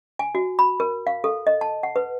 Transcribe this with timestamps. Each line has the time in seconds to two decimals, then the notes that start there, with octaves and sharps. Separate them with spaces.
0.19 G#5
0.35 F#4
0.59 B5
0.80 A#4
1.07 F5
1.24 A4
1.47 D#5
1.61 A5
1.83 F#5
1.96 B4